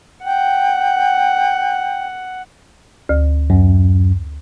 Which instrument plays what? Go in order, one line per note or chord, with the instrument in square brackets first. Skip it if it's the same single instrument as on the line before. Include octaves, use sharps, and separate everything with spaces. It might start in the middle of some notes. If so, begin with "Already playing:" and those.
[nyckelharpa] F#5 [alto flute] G5
[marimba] D2
[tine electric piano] F#2